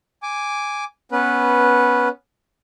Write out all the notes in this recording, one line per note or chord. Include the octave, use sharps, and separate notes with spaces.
G#5 D6
B3 C#4 B4